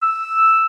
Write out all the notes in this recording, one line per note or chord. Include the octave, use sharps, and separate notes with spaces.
E6